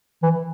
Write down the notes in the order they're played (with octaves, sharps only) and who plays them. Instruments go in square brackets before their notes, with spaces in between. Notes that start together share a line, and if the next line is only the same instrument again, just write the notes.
[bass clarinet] E3